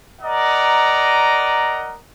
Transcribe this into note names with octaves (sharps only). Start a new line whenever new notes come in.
A#4 D5 D#5 F#5 A#5